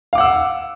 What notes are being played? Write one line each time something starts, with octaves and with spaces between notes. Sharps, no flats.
F5 F#5 D6 E6